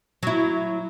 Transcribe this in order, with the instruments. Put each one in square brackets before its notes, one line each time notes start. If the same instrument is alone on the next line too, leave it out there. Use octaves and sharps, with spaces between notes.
[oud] F#3 E4